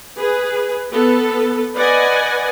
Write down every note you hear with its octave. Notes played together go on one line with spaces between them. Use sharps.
G#4 B4
B3 A4 B4
B4 D5 D#5 F#5 G#5